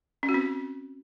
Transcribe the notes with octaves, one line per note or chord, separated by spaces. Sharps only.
C#4
F#4
C4